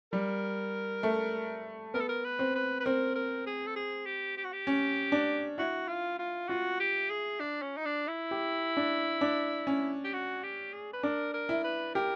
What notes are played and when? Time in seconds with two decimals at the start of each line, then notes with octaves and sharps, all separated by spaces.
0.12 G3 A#4
1.03 A3
1.94 B3 A#4
2.01 A4
2.09 A#4
2.24 B4
2.39 C4
2.55 B4
2.80 B4
2.85 C4 A#4
3.15 A#4
3.46 G#4
3.67 A4
3.76 G#4
4.06 G4
4.37 G4
4.44 F#4
4.53 G4
4.67 C#4
5.12 D4
5.58 E4 F#4
5.88 F4
6.19 F4
6.49 F4 F#4
6.80 G4
7.10 G#4
7.40 D4
7.62 C#4
7.77 D#4
7.86 D4
8.08 E4
8.31 G4
8.77 D4
9.21 D4
9.67 C#4
10.04 G4
10.13 F#4
10.43 G4
10.73 G#4
10.93 B4
11.03 D4 A#4
11.34 A#4
11.49 E4
11.64 B4
11.95 G4 A#4